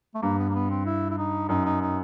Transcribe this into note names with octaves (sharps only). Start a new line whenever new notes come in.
A3
G2 A#3
B3
A#3
B3
C4
E4
E4
D#4
F#2 D#4
D#4
D#4